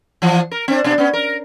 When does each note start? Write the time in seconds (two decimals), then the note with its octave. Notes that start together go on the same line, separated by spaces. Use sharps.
0.22 E3 F3
0.51 A#4
0.68 C4 D4
0.84 B2 D4
0.98 B3 C#4
1.13 A#4